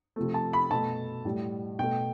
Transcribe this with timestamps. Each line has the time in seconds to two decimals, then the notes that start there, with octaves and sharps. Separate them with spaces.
0.16 C3 F3 A3
0.34 A5
0.53 B5
0.70 B2 A3 A5
1.25 A2 G3
1.79 B2 A3 G5